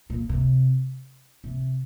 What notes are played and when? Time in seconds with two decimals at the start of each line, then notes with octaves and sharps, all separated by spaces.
0.10 A#2
0.29 C3
1.44 C3